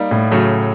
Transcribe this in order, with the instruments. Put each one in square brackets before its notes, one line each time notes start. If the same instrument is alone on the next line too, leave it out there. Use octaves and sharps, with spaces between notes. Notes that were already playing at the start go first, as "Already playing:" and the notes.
Already playing: [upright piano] G3 A#3 D#4
[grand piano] A2
[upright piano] C#3 F#3 A3